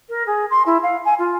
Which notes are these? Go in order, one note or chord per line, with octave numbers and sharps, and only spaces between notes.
A#4
G#4
C6
E4
F5
G#5
F4